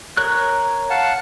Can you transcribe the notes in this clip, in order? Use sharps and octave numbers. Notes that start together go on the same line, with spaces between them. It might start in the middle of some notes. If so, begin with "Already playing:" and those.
A#4 C#5 F#6
F5 F#5 A5